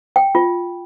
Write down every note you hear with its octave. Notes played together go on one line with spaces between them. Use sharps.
G5
F4